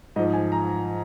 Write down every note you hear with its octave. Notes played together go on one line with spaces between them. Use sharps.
G#2 F3 D#5
G#5
A#5